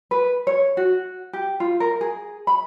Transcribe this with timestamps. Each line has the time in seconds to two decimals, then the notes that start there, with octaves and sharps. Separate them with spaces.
0.11 B4
0.47 C#5
0.77 F#4
1.33 G4
1.60 F4
1.80 A#4
2.01 G#4
2.47 B5